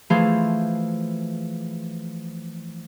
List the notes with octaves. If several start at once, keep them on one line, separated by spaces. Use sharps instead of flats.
E3 F3 A3 G#4 C5 F5